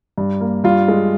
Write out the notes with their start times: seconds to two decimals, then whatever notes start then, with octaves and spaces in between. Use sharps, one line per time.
0.18 G2
0.41 A#3
0.64 G2 F4
0.88 G#3